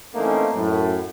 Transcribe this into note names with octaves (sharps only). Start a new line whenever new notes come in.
E3 A3 A#3 C4 C#4 D#4
F#2 A2